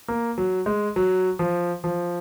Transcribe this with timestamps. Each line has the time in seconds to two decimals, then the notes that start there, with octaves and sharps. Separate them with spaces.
0.08 A#3
0.38 F#3
0.66 G#3
0.96 F#3
1.39 F3
1.84 F3